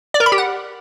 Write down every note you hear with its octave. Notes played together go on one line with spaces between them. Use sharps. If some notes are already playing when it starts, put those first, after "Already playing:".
D5
A#4
B5
G4
F#5